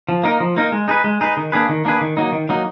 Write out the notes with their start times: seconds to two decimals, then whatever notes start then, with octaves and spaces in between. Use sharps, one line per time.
0.09 F3
0.24 A#3 D#4 A#4
0.40 F3
0.56 A#3 D#4 A#4
0.72 G#3
0.88 D#4 G#4 B4
1.04 G#3
1.21 D#4 G#4 B4
1.37 D#3
1.52 A#3 D4 G#4 B4
1.69 D#3
1.85 A#3 D4 G#4 B4
2.01 D#3
2.17 F#3 A#3 D#4
2.32 D#3
2.49 F#3 A#3 D#4